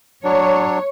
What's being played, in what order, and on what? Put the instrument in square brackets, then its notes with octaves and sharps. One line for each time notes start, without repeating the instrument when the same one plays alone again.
[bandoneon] F#3 D4 [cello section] C#5